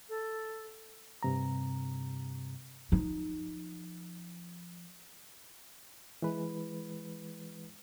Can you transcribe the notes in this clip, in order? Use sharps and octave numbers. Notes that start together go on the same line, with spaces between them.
A4
G2 C3 A#5
F3 D#4
E3 G#3 B4